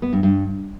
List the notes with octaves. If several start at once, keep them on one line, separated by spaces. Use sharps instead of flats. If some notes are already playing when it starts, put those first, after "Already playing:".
B3
G2
G2